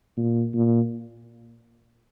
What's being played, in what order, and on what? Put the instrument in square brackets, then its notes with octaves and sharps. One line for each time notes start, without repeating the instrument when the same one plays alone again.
[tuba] A#2
A#2